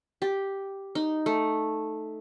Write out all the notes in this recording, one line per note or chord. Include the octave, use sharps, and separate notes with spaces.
G4
D#4
A3